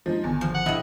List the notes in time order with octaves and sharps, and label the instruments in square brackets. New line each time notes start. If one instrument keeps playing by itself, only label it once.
[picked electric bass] G2 G#3 A#3 [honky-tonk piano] F3 D#4
[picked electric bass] G#1 D3 D#3 [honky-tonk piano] E2
[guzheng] F3
[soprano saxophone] F#5
[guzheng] G2 B2 [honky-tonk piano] E4 D#5